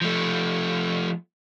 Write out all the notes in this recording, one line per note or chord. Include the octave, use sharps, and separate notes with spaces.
F3 A3